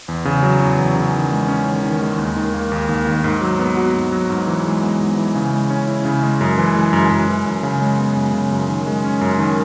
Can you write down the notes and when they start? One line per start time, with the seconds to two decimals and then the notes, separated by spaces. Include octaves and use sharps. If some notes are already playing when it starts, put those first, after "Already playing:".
0.08 E2
0.25 C#3
0.43 F#3
0.61 E2
0.78 E2
0.96 C#3
1.14 D#3
1.31 G#3
1.48 C#4
1.66 D#3
1.84 D#3
2.01 G#3
2.18 D#2
2.36 D#3
2.54 A#3
2.72 D#2
2.89 D#2
3.07 D#3
3.24 G#2
3.41 F#3
3.59 B3
3.77 F#4
3.94 G#2
4.12 F#3
4.30 G#2
4.47 E3
4.65 G#3
4.82 B3
5.00 G#2
5.17 E3
5.35 C#3
5.53 G#3
5.70 C#4
5.87 E4
6.05 C#3
6.23 G#3
6.41 F#2
6.58 E3
6.76 G#3
6.93 F#2
7.11 F#2
7.28 E3
7.46 F#2
7.63 C#3
7.81 G#3
7.98 B3
8.16 F#2
8.34 C#3
8.51 F#2
8.69 D#3
8.87 G#3
9.04 C#4
9.21 F#2
9.39 D#3